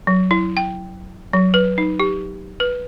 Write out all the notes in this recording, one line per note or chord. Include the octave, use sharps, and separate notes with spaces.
F#3
E4
G5
F#3
B4
D#4
G4
B4